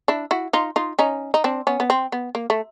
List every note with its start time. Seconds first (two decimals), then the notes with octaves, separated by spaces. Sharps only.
0.08 D4 E4
0.31 E4 F#4
0.53 D#4 F4
0.76 D#4 F4
0.99 C#4 D#4
1.34 D#4
1.44 C4 D4
1.67 B3 C#4
1.80 B3
1.90 C4
2.12 B3
2.35 A#3
2.50 A3